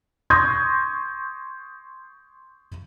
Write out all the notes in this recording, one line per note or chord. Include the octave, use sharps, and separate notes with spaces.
C6 C#6 D#6 G6 G#6 A#6